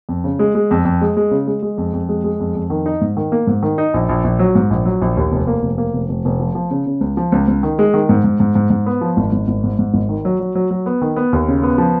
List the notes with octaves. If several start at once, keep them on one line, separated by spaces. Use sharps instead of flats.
F2
C#3
G#3
G#3
F2
F2
G#3
G#3
C#3
G#3
G#3
F2
F2
G#3
G#3
F2
F2
D#3
D#4
G#2
D#3
A#3
G#2
D#3
D#4
A#1
A#1
A#1
F#3
G#2
A#1
F#3
A#1
D#2
F1
A#3
F1
A#3
F1
F1
F1
F3
F3
C#3
C#3
C#2
F3
C#2
C#2
D#3
G#3
D#3
G#2
G#2
G#2
G#2
G#2
B3
F3
G#1
G#1
G#1
G#2
G#2
G#1
D#3
F#3
F#3
F#3
F#3
B3
D#3
B3
D#2
C#3
B3
F3